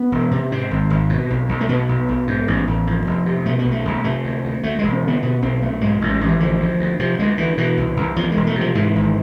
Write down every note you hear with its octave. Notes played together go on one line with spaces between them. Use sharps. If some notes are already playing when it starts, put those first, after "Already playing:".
Already playing: B3
E1
C3
G#2 C4
G#1
G#1
B2
B1
B1
A3
B2 B3
B1
B1
G#2
A1
A1
F2
F1
C3
B2 A3
B3
B1
A3
B1
C3 A3
D2
D2
D2 A3
E1 G#3
C4
D3 B3
B2 B3
B1 C4
B1 A3
G#2 G#3
A1
A1
E3
D3 F3
D2
D2
C3 F3
D2 G#3
D2 E3
B2 E3
C2
C2
E2 F3
G#3
E1
A3
C3
F3
G#2 E3
G#1